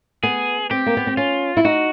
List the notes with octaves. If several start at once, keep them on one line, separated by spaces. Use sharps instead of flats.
B3 G#4
C4 G4
A#3
B3
C4
C#4 F4
E4
D#4 F#4